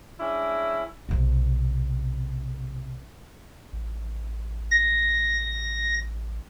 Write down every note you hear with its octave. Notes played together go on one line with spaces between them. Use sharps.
G#3 C#4 D4 E4
B1 C3
A1
A#6